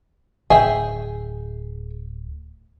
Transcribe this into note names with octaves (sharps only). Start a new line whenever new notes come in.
D1 G#4 E5 G5